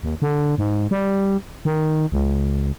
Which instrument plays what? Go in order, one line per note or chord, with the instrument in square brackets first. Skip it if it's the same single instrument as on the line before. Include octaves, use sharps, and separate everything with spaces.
[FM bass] D#2
D3
G#2
G3
D#3
C#2